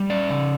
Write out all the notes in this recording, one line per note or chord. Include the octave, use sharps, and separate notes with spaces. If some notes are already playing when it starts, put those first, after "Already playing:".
Already playing: G3
C#4 D5
C#3